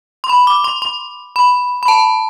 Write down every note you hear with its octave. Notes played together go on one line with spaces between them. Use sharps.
C6
B5
D6
C6
C6
B5
B5
A5